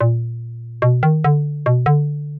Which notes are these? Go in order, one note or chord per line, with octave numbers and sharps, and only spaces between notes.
A#2
B2
D#3
D3
B2
D3